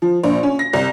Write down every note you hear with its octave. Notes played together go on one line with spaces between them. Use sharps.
F3
A#1
C#4
A#6
C2